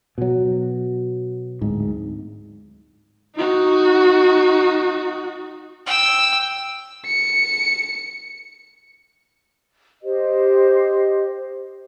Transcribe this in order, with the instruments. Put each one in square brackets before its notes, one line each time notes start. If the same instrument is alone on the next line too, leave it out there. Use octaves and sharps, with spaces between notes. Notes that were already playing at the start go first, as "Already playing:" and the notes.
[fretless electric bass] B2 F#3
D1 G#2
[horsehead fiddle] D#4 F#4
[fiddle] G5 E6
[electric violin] C#7
[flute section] G4 C5 D#5